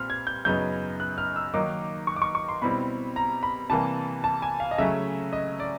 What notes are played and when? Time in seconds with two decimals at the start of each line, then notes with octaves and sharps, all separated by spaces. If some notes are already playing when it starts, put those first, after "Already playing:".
Already playing: A#2 G3 C4 C6 F6
0.10 G#6
0.27 G6
0.45 F#2 C#3 F#3 B3 D#4 G6
1.00 F#6
1.18 F6
1.36 E6
1.54 D#3 F#3 A#3 D#4 D6
2.07 C#6
2.16 D6
2.22 C#6
2.35 C#6
2.49 C6
2.62 B2 G3 C4 E4 B5
3.16 A#5
3.43 B5
3.70 C3 E3 G3 A#3 A5
4.24 A5
4.42 G#5
4.60 F5
4.71 D#5
4.78 C#3 F#3 A3 C#4 E5
5.33 D#5
5.60 D5